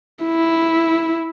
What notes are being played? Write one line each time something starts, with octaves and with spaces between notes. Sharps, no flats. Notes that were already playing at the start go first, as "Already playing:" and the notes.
E4